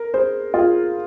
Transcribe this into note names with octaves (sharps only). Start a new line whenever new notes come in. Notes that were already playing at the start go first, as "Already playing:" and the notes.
Already playing: A#4
G#4 C5
F4 G#4